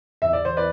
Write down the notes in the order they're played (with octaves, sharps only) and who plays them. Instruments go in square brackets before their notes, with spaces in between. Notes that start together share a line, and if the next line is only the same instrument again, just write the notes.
[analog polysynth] E2 [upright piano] E5
[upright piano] D5
C5
B4 D5